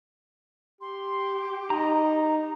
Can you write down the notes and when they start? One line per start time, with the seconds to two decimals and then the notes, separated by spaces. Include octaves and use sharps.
0.81 G4 C6
1.70 D#4 D#5 A#5